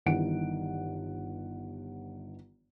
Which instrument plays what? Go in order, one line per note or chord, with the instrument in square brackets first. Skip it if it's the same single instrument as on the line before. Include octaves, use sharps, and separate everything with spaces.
[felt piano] G1 G2 D#3 E3 F#5 D7